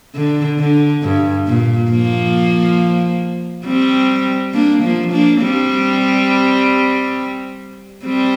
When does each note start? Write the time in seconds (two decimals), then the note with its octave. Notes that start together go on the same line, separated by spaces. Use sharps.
0.15 D3
0.59 D3
1.03 G2
1.47 A#2
1.91 F3 A#3
3.66 G3 C4
4.53 A#3 D4
4.83 F3 A#3
5.13 A#3 D4
5.42 G3 C4
8.05 G3 C4